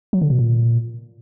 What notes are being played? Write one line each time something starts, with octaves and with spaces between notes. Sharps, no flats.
F#3
D3
B2
A#2